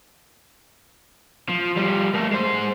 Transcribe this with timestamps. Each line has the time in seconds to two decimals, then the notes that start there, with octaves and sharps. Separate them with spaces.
1.49 F3
1.77 F3 G3
2.14 A3 A#3
2.32 G#3 C5